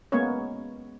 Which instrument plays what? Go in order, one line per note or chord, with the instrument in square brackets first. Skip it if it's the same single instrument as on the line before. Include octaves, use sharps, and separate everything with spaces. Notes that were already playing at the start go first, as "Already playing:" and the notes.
[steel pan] G#3 A#3 B3 C#4 C#5